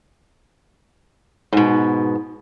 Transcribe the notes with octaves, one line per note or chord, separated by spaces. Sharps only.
G#2 B2